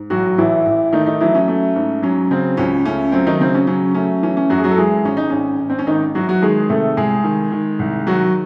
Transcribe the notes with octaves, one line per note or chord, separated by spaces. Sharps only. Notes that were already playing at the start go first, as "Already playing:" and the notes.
Already playing: G#2
A1 F#3 F#4
A1 E3 E4
A1
D#3 A3 D#4
D#3 D#4
E3 F#3 E4
C#4
A3
G#2
F#3 C#4
C#3 C4
C#2 C#4
A3 C#4
F#3 C4
D#3 D#4
C#3 C4
C#4
F#3 C#4
A3 C#4
E3 C#4
C#4
F#2 F#3 F#4
G#4
F#3 F#4
A4
E3 G#3 G#4
G#1 C#4
D#4
G#1 C#4
G#1
C4
C#4
G#1 D#3 D#4
E3 F#3 F#4
F#3 F#4
D#3 G#3 G#4
C3 A3 A4
C2 G#3 G#4
D#3
D#3
C2
D#3 F#3 F#4